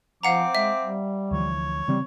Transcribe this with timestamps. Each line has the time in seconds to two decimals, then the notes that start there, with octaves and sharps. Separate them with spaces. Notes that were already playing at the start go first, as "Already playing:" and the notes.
0.23 F3 C4 F5 F#5 A#5 D6
0.55 G#3 E5
0.80 G3
1.31 D2 E3 F3 C#5
1.88 C#3 E3 G3 C4